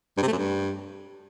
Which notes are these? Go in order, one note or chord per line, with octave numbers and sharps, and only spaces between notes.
G2
C3
A3
F#2
G2